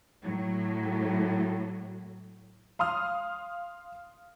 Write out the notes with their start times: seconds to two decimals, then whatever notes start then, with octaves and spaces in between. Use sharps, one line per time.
0.22 A2 F#3
2.79 F5 C6 D#6 F6